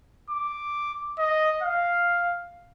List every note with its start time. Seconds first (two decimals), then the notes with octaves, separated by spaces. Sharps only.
0.30 D6
1.19 D#5
1.63 F5